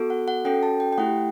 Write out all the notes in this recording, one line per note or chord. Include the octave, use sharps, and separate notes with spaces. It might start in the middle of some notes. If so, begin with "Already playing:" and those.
Already playing: B3 F#4 A4
F#5
F#5
C#4 F#4 A4 G5
A5
G5
G5
A3 E4 G4 F#5